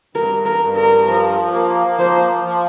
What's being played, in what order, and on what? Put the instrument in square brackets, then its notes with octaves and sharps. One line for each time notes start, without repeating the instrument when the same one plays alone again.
[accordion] G2 [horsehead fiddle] A#4
[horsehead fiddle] A#4
[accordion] G2
[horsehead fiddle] A#4
[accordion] F3
A#3
[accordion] F3 [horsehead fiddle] C5
[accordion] F3